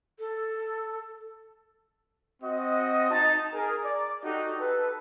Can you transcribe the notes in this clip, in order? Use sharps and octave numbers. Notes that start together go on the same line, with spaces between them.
A4
C4 F#4 D#5
D#4 A5
G#4 A#4
D5
D#4 F#4 G4 A4
A4 B4